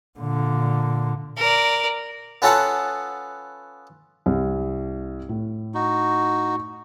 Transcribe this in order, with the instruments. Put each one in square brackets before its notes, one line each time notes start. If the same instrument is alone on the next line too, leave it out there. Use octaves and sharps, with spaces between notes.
[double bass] A#2 D3
[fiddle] A#4 D5
[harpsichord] B3 C#4 F4 A4 F#5 A5
[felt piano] C2
A2
[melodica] D#4 F#4